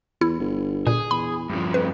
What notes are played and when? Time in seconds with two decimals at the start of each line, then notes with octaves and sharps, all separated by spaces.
0.21 E2 E4
0.40 G1
0.87 A#2 G#4
1.11 E2 B5
1.50 D1 G2 F3
1.74 F2 B4